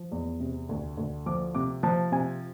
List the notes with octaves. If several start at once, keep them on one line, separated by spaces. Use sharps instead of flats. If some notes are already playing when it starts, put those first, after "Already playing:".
Already playing: F3
E2
C3
D2
D2
F3 D6
C3 D6
F3 A5
C3 G#5